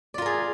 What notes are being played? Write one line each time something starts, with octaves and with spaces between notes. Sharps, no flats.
F4 G#4 A#4 D5